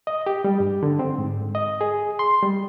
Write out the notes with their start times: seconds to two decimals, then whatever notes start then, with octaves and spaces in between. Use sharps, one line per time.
0.07 D#5
0.27 G4
0.44 G3
0.60 G2
0.83 D3
0.99 C4
1.18 G#2
1.55 D#5
1.81 G#4
2.19 C6
2.43 G3